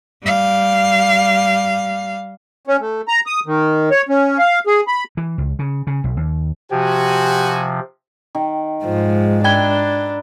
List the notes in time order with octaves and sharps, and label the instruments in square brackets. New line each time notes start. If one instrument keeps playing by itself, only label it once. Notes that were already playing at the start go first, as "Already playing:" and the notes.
[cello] G3 F5
[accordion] C#4
A3
A#5
D#6
D#3
C#5
C#4
F5
G#4
B5
[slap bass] E3
C#2
C#3
C#3
B1
D#2
[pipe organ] C3 F3 [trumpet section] F#4 G#5 [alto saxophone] G4
[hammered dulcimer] D#3
[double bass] G#2 G#3 [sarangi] F3
[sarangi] D4 [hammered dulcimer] A#4 B4 E5 [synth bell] G5 G#6 G7